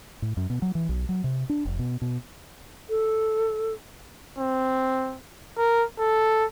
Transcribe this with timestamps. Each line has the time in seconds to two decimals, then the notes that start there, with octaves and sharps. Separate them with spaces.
0.22 A2
0.37 F#2
0.50 B2
0.62 F#3
0.75 E3
0.89 B1
1.09 F#3
1.24 C3
1.49 D4
1.65 F1
1.79 B2
2.02 B2
2.90 A4
4.39 C4
5.58 A#4
5.99 A4